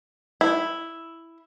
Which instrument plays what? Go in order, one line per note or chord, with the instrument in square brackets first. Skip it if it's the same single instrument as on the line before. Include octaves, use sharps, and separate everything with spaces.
[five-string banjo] E4